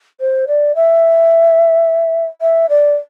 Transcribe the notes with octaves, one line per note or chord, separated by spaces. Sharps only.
C5
D5
E5
E5
D5